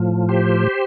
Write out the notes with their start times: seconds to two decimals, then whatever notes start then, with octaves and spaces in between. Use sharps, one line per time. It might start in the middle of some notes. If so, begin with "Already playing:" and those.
Already playing: A2 F3
0.29 G4 C5